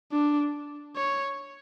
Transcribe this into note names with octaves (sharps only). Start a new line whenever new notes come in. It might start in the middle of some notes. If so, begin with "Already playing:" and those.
D4
C#5